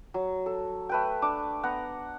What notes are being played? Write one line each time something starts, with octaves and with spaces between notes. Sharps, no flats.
F#3
A4
A3 B4 G5
D4 D6
B3 F#5 A#5